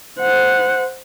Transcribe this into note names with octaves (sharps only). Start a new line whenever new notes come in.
C5 F#5